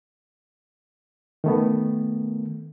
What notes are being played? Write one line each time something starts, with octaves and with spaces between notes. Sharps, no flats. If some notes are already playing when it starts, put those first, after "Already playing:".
D#3 A3 B3